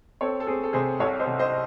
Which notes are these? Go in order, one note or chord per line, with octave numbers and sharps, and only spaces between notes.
C4 A4 C#5
A4
C4 G#4
A4
C3 G#4 C5
C2 A4 C#5
C5 D#5
C3
C5 D#5